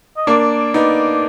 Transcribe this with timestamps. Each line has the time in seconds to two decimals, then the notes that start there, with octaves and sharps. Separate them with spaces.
0.17 D#5
0.27 A#3 D4 D5
0.74 B3 D#4